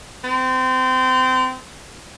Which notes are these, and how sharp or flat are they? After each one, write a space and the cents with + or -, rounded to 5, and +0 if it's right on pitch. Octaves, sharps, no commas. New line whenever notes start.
C4 -25